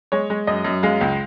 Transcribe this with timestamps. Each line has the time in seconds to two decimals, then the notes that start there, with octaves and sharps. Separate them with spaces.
0.12 G#3 C#5
0.30 G#3
0.47 F#2 D#5
0.64 F#2
0.83 G#3 F5
1.01 C#2